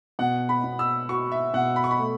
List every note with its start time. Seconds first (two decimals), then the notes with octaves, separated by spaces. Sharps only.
0.19 B2 F#5
0.49 B5
0.64 B2
0.79 E6
1.09 F#4 C#6
1.32 E5
1.54 B2 F#5
1.76 B5
1.84 C#6
1.91 B5
1.99 A3